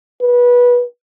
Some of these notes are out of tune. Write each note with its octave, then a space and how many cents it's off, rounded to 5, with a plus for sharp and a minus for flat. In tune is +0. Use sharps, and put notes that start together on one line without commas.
B4 -20